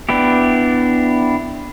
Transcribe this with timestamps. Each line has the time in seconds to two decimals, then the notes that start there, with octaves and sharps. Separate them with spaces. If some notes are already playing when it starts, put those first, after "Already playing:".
0.09 B3 D4 E4 G4